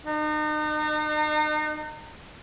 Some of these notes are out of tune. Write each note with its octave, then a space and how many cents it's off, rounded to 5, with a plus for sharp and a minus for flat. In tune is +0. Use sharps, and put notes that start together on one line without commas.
D#4 -40